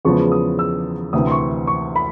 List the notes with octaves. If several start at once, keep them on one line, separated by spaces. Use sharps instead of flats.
E2 C#3 F3 G#3 B3 C#6
D#6
E6
D2 C3 E3 D#6
C6
C#6
C#6
B5